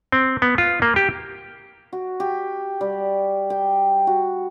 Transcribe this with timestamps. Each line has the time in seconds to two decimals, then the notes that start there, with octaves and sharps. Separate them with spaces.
0.12 C4
0.42 B3
0.58 F4
0.82 A#3
0.96 G4
1.93 F#4
2.20 G4
2.81 G3
3.50 G5
4.07 F#4